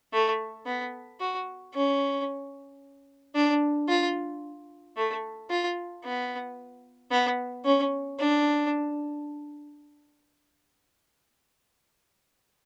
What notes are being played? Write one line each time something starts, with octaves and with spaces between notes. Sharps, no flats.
A3
B3
F#4
C#4
D4
F4
A3
F4
B3
B3
C#4
D4